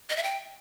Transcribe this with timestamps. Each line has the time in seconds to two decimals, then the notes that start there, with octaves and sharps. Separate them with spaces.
0.10 D#5
0.16 E5
0.23 G5